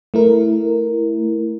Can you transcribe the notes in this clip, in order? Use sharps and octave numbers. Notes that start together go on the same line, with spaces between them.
A3 E4 A#4